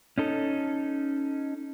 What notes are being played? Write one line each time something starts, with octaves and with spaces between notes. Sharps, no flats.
C#4 D#4 A4